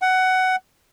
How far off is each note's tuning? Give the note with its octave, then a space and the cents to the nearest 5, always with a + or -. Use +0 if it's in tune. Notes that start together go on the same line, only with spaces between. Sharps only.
F#5 +15